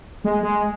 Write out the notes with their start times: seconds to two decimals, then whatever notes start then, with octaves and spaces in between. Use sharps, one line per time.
0.24 G#3
0.43 G#3